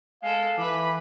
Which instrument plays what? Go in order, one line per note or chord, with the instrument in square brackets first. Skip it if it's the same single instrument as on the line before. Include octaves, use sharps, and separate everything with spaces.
[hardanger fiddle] G#3 A4 [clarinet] F5
[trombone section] E3 [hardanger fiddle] B4 B5 [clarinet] D6